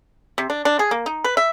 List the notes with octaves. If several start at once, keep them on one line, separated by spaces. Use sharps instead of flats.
C3
D4
D4
G#4
A#3
D#4
B4
E5